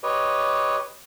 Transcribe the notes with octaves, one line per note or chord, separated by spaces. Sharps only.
G4 B4 C#5 D#5